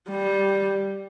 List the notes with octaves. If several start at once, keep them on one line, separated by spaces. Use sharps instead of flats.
G3